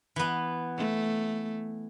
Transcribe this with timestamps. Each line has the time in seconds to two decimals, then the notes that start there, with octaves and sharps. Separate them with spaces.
0.16 E3 B3
0.77 A3